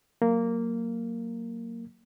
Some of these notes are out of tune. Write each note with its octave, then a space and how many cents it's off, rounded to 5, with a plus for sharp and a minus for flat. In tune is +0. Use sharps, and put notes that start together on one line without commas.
F#3 +0 A#3 -10